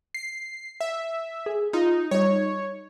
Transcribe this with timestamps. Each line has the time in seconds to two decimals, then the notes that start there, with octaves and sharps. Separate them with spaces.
0.14 C7
0.81 E5
1.46 G#4
1.73 D#4 F4
2.11 G3 D#4 C#5